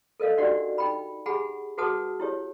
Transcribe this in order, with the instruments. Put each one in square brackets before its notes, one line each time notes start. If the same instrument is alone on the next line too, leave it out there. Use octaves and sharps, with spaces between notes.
[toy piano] A4 A#4 D#5 F5
D4 D#4 F#4 G4 D5 F#5
D#4 G5 B5
G4 G#4 F#5 G#5 B5
F#4 G#4 B4 F#5 A5 D#6
E4 G4 C#5